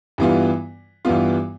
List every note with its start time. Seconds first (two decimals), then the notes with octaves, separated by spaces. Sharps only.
0.18 G2 E3 G3 B3 F4
1.05 G2 E3 G3 B3 F4